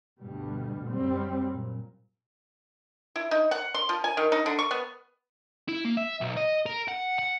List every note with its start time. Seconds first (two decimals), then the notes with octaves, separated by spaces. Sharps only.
0.21 D2 G2 B2 G3
0.91 F#2 G3 C4
1.49 A#2
3.16 E4
3.31 D#4
3.51 F#5
3.74 C6
3.89 F3
4.04 G#5
4.17 D#3
4.32 D#4
4.46 D3
4.59 C#6
4.71 B3
5.68 E4
5.85 A#3
5.97 E5
6.21 B1
6.37 D#5
6.66 A#4
6.88 F#5
7.19 F#5